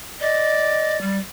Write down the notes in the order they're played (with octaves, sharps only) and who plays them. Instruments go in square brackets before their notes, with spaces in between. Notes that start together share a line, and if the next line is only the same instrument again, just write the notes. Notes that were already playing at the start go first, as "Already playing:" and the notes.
[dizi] D5 [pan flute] D#5
[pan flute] G3